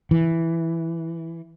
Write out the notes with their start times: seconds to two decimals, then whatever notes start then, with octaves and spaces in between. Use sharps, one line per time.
0.11 E3